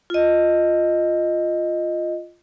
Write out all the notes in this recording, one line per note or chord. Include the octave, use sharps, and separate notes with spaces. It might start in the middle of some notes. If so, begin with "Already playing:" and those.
F4 D#5